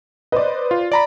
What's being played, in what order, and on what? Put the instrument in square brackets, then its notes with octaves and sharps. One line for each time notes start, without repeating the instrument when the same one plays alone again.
[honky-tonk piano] B4 C5 D5 [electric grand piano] D#5
[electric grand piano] F4
D5 A#5 B5